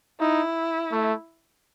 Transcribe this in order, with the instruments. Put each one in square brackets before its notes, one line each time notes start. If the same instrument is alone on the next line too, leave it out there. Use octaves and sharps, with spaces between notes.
[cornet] D#4 [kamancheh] E4
[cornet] A3